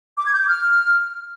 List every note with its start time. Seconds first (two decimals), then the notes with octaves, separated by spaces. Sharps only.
0.17 D6
0.25 G#6
0.33 G6
0.41 D6
0.48 F6